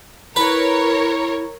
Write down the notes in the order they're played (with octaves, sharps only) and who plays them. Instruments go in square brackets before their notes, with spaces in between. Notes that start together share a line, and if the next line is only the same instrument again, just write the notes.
[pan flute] E4 [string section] A#4 C#5 [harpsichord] B4